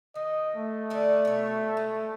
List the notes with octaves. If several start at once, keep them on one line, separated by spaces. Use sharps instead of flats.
D#3 D#5
A3
D3 D4 D#4
B2 C#5
G#3